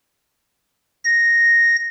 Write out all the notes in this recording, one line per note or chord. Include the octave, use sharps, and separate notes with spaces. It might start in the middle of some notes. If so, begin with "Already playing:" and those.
A#6